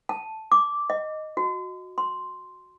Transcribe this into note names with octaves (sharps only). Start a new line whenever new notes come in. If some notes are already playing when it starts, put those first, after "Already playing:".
A5
D6
D#5
F#4
C6